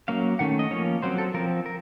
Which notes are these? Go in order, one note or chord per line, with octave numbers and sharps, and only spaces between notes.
F#3 A#3 C#4 F5
D#3 A3 C#4 F#5
D#5
F3 A#3 C#4 C#5
F#3 C4 C5
A4
F3 C4 A#4
A#4